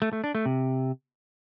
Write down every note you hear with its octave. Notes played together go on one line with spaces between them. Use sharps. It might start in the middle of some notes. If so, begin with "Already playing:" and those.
A3
A3
D4
A3
C3